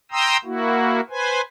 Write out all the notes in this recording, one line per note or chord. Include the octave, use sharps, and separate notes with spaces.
G5 A#5 C6 D#6 E6
A#3 E4 F#4
B4 C5 G#5